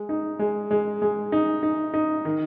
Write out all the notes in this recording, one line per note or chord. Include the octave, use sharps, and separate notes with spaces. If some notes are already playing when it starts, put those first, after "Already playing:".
Already playing: G#3
D#4
G#3
G#3
G#3
D#4
D#4
D#4
D#3